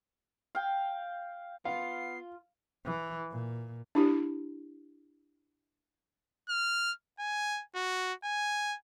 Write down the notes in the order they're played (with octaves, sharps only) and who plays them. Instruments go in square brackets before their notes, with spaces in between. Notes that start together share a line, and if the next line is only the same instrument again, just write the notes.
[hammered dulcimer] F5 G5
[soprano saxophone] B3 [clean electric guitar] F4 [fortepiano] F5 [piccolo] C7
[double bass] E3
A#2
[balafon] D4 E4 G4
[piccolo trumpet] F6
G#5
F#4
G#5